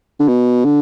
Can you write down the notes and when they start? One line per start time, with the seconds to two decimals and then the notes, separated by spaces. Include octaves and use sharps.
0.19 D3
0.28 B2
0.64 D3